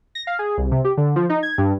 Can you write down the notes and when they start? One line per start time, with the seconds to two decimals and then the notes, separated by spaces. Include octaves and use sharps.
0.15 A#6
0.27 F5
0.39 G#4
0.58 C2
0.71 C3
0.84 G4
0.97 D3
1.16 F3
1.29 D#4
1.43 G#6
1.58 G2